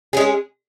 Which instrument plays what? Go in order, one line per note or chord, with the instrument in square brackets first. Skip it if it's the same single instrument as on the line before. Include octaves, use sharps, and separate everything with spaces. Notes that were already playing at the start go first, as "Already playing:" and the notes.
[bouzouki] G#3 C#4 G#4